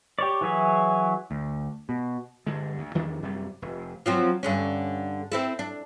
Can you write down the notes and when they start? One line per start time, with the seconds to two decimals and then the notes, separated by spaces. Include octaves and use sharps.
0.19 G4 C#5 D5
0.41 E3 F#3 E4 G#4 C#5
1.31 D2
1.89 B2
2.47 G2 D3 G#3
2.78 D2
2.95 E2 D#3 F3 D4
3.22 F#2 C3 G3
3.62 F1
4.06 F3 F#3 C4
4.43 G2 D3 C#4
5.32 C4 E4 A4
5.59 D4